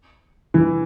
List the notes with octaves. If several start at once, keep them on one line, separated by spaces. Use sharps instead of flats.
E3